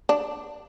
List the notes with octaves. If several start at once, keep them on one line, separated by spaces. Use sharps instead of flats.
D4